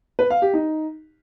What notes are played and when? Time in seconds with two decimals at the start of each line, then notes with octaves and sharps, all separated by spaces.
0.19 B4
0.30 F5
0.42 G4
0.54 D#4